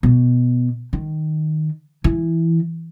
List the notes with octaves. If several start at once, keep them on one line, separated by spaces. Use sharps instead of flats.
B2
D#3
E3